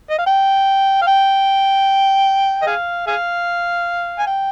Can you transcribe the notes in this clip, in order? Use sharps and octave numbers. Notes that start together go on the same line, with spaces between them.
D#5
F5
G5
F5
G5
D#5
G#4 F5
G#4 F5
G#5
G5